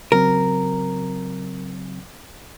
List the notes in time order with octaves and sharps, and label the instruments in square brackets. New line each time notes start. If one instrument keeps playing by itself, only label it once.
[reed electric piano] C#3 F#3 C4 [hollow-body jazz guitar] A#4